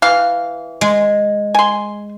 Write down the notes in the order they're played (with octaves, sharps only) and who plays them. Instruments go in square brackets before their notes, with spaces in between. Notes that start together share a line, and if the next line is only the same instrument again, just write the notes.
[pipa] E3 F5
[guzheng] G#3
[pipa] G#5 C6